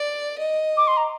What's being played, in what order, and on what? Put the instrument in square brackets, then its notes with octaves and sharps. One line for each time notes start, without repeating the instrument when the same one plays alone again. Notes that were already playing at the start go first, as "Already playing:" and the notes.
Already playing: [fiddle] D5
D#5
[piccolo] D6
C6
A#5